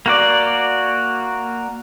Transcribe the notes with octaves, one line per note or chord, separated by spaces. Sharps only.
A#3 F#4 D5